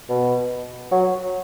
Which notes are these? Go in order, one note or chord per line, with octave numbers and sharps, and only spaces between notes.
B2
F#3